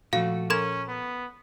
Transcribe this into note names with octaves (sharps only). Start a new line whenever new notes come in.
A#2 F3 A3 F#4 F5
C#4 A4 A#4 C6 G#6
B3